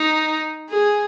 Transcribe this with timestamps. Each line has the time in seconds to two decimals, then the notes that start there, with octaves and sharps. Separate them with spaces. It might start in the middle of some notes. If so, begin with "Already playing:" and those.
Already playing: D#4
0.70 G#4